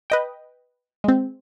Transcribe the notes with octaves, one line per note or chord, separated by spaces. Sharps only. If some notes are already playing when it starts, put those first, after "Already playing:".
B4 D#5 G5
G#3 C4